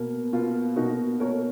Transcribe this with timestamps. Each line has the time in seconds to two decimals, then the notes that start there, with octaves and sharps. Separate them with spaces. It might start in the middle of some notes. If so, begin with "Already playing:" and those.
Already playing: B2 A#3
0.33 B2 A#3 F4
0.76 B2 A#3 D#4 F#4
1.20 B2 A#3 A#4 C#5